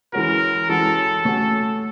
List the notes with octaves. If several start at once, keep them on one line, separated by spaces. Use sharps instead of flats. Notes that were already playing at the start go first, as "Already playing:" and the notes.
E3 G#3 C#4 F#4 A#4
E3 G#3 C#4 F#4 A4
A3 C#4 F#4